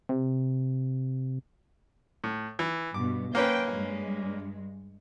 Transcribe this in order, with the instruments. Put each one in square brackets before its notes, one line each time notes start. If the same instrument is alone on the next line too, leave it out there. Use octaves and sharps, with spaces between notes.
[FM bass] C3
[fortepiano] A2
E3
[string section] G2 B2 [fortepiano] D6
[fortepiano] A#3 C#4 B4 [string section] C5 G5
[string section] G2 G#3